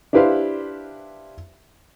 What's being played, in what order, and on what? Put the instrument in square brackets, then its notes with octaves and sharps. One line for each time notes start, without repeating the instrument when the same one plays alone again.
[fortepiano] D4 E4 G4 B4 C5 F5